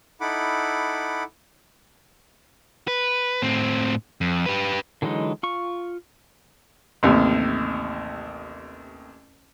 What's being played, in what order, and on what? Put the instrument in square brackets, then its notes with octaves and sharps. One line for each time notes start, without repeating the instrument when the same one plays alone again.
[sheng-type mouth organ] D#4 E4 A4 F#5 B5 D6
[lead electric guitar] B4
A2 C4
F2
G4 B4
[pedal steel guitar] D3 E3 F#3 G#3 D#4
F4 C#6
[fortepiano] A1 D#2 C3